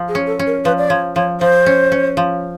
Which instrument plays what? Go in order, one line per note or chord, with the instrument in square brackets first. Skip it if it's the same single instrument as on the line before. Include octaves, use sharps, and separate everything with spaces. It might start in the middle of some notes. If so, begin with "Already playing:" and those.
Already playing: [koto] F3
[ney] G#4
[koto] C#4
[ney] A4
[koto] C#4
[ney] A#4
[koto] F3 [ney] B4
[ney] D5
[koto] F3 [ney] C#5
[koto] F3 [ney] C#5
[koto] F3 [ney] C5
[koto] C#4
C#4
F3